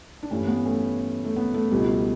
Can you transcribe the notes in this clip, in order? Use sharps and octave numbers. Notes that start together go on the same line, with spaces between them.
D4
G2 E3 G3 A3 C#4
B3
A3 C#4
A3
B3
A3
C#2 B2 G3